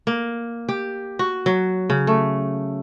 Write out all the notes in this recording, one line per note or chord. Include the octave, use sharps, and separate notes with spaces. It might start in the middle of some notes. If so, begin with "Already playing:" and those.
A#3
G4
F#4
F#3
C#3
A3